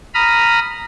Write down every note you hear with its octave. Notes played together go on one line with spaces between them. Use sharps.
A#5 B5 D#6 F6